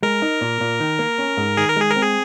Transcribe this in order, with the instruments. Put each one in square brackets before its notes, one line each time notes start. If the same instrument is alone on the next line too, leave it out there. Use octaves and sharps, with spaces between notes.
[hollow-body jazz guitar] G#3 [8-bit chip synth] A#4
[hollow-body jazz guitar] D#4
A#2
A#2
D#3
A#3
C#4
G#2
[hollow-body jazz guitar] D#3 [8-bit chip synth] G#4
[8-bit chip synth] A#4
[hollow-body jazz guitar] G#3 [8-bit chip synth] G#4
[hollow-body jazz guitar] C4 [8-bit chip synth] A#4
[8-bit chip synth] G#4